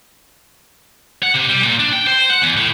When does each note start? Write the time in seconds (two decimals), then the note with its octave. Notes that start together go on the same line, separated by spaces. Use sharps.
1.23 F#5
1.35 C3
1.49 G3
1.63 A#2
1.79 D4
1.93 G5
2.07 C5
2.30 F#5
2.42 E2
2.57 A2